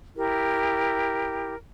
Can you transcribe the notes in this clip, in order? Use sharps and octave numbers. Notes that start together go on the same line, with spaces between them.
E4 G4 A#4